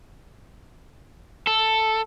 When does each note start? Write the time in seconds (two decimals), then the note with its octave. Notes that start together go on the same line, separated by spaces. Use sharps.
1.47 A4